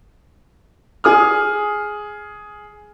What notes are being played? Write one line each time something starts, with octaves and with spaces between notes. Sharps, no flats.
G#4 D#6 F6